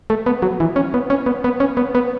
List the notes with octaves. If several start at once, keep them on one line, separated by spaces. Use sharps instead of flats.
A3
B3
F#3
E3
C#4
B3
C#4
B3
B3
C#4
B3
B3